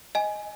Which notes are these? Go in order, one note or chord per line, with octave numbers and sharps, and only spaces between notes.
D#5 G#5